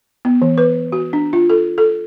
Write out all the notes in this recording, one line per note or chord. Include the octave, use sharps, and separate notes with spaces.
B3
E3
B4
F#4
D4
F4
A4
A4